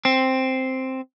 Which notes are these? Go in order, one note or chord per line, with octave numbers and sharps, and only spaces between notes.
C4